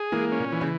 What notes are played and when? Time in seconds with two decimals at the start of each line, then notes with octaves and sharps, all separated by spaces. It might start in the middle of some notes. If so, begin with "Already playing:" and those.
Already playing: G#4
0.12 E3 G#3 A#3
0.32 C#4
0.40 A#2
0.52 E3
0.61 C#3